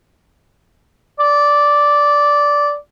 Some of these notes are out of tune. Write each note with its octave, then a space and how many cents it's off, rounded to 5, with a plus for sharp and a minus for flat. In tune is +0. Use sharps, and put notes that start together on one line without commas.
D5 -10